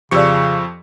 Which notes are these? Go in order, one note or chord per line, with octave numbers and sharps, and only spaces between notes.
F2 C#3 F3 G4 D5 C#6 E6 C#7